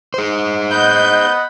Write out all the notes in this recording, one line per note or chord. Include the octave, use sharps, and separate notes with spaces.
G#4 C5
D#5 F#5 B5 G6